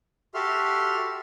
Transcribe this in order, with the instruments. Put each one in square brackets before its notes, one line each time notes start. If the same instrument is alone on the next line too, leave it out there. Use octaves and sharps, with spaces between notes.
[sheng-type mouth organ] F#4 G4 A4 E5 C6 F6